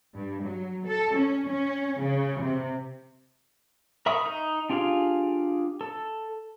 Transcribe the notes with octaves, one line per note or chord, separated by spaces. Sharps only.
G2
F#3
A4
C#4
C#4
C#3
C3
A#4 E5 B5 C#6 D#6
D#4
D4 F4 G4 G#4 F5
A4